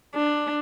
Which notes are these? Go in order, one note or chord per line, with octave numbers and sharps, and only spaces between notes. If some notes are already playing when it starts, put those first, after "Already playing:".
D4